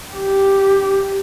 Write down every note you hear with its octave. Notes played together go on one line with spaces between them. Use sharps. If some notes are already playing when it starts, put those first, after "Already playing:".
G4